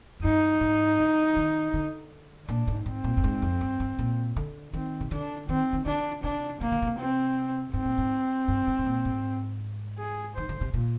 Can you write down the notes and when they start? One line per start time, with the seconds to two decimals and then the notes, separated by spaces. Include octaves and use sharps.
0.20 F2
0.24 G2 D#4
0.61 G#2
0.99 D3
1.36 D#3
1.74 D3
2.48 A#2 D4
2.67 G#2
2.86 G#2 C4
3.04 A#2
3.17 G2
3.24 G#2
3.42 F2
3.61 G2
3.80 G2
3.99 A#2
4.36 D3
4.73 D#3 C4
5.01 C3
5.11 D3 D4
5.48 D#3 C4
5.73 D#3
5.86 D3 D4
6.24 C3 D4
6.61 C3 A#3
6.72 D3
6.82 C3
6.99 C4
7.74 G#2 C4
7.85 A#2
7.98 G#2
8.48 G2
8.67 G#2
8.79 G#2
8.86 A#2
9.05 G#2
9.98 G#4
10.36 D#3 C5
10.49 D3
10.61 C3
10.74 A#2